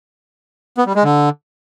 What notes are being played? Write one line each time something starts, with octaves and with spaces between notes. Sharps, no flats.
B3
G3
G#3
D3